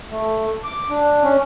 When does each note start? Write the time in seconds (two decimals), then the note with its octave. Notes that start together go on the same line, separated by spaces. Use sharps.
0.11 A3
0.64 D6
0.90 D4
1.24 C#4